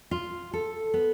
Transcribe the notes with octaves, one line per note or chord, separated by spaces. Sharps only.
F4
A4
B3